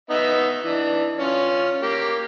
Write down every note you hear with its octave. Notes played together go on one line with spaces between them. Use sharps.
B3 D#4 E5
E3 D4
C#4 F4
A#3 G4